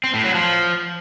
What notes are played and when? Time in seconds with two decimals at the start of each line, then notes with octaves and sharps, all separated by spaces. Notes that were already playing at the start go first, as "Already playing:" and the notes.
0.04 C4
0.14 A2
0.24 F#3
0.34 F3